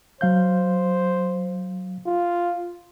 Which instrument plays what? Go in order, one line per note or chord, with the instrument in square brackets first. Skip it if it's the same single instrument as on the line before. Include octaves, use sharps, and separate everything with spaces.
[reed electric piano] F#3 F5 G6 [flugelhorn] C5
[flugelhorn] F4